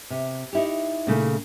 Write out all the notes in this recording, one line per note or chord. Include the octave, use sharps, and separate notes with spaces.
C3
D#4 E4 G4
A#2 C#3 A3